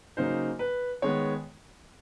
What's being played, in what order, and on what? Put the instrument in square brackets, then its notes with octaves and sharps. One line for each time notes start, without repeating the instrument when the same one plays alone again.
[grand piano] C#3 F#3 A#3 D#4 C5
B4
D#3 G#3 B3 C#5